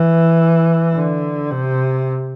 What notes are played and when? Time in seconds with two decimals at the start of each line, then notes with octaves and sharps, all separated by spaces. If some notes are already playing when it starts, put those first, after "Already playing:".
Already playing: E3
0.94 D3
1.51 C3